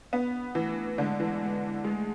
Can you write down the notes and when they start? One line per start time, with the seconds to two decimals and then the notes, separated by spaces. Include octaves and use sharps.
0.13 B3
0.55 E3 A3
0.98 D3 G#3
1.20 E3
1.41 G#3
1.84 G#3 A3